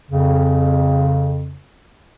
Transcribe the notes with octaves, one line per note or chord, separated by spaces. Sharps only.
F2 C#3